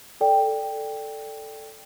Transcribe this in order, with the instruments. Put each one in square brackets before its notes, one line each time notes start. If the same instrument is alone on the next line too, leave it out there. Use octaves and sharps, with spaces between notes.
[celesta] A4 D5 G5